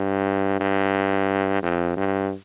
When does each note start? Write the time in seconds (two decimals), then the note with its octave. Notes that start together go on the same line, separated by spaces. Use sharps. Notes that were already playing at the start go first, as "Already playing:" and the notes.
Already playing: G2
0.60 G2
1.63 F2
1.97 G2